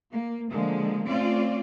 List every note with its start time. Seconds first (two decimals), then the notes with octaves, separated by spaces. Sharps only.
0.12 A#3
0.51 D3 F3 G#3 A#3
1.07 A3 C4 C#4 F4 D5